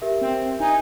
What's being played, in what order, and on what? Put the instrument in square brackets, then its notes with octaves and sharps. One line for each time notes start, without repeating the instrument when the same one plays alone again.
[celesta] G4 A#4 E5
[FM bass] C4
[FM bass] D#4 [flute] G#5